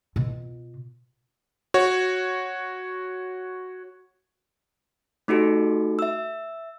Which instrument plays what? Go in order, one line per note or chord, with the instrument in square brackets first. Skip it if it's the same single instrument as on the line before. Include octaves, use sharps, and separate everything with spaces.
[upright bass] B2 F4
[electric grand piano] F#4 C#5
[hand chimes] A3 D#4 F#4 G4 A4
E5 E6